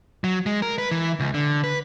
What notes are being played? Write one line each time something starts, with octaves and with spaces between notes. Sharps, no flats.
F#3
G#3
A#4
B4
E3
C#2
D3
B4